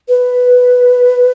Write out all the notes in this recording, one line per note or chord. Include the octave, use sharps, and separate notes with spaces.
B4